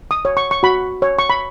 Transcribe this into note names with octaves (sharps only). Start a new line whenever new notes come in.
D#6
C#5
C#6
C#6
F#4 B5
C#5
C#6
B5